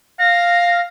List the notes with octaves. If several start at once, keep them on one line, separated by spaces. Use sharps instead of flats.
F5 A#6